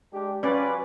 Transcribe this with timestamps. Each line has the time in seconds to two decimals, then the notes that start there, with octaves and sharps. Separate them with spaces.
0.13 G#3 D4 G4
0.43 F#3 C#4 F4 B4 D5